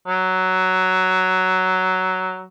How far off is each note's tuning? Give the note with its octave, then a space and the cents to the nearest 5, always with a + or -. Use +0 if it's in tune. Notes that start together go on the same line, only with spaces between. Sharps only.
F#3 +10